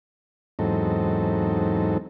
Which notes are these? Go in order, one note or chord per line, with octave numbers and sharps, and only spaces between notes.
E2 G#2 F#3 C4 D#4 A4